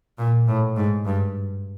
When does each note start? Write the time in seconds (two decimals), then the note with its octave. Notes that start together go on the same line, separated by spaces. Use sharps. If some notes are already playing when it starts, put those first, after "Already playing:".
0.18 A#2
0.47 A2
0.77 G#2
1.06 G2